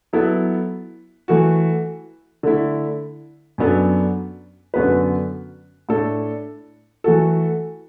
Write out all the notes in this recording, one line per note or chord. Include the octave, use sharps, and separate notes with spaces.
F#3 B3 E4 A4
E3 A3 F#4
D3 A3 E4
F#2 F#3 B3 D4 A4
F#2 D3 B3 F#4 B4
A2 A3 D4 A4
E3 A3 F#4 A4